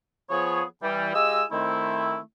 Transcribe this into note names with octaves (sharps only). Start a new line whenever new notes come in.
F3 B3 G#4 C#5
E3 G3
G#3 F4 G4 D#5 G#5 E6
D#3 A3 C4 E4